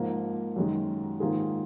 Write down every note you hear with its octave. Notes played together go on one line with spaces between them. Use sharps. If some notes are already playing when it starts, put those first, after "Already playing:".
Already playing: G#2 F3 A#3
F#2 D#3 G#3
G#2 D#3 A#3 F4 G#4